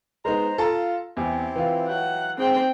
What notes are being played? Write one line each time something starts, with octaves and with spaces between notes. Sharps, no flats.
G#3 B3 D#4 C5 A#5
F4 A4 A5 A#5
E2 C4 E4 G4
E3 F4
F#3 E5 F#5 G5
G#2 C4 G5